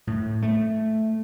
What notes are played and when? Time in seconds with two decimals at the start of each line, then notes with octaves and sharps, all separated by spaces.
0.07 A2
0.42 A3